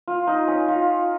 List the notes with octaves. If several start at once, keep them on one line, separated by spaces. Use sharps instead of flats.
F4
D#4
C#4
F4